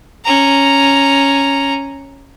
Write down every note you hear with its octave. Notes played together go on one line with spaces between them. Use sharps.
C#4 A#5